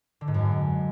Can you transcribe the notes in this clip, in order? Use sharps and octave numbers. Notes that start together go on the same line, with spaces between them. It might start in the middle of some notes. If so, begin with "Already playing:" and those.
D3
G#2
F#2